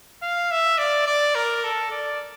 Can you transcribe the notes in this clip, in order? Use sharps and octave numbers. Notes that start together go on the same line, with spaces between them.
F5
E5
D5
D5
A#4
A4
D5